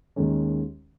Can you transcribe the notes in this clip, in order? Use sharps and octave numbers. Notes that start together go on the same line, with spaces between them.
D#2 D#3 G#3 C#4